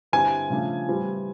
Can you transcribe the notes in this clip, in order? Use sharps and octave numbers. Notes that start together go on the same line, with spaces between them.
G2 D3 G3 C4 E4 G#5
C#3 F3 A3 D4
A2 E3 G3 C4